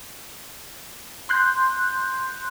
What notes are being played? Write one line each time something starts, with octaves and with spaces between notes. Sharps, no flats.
C6 F#6 G6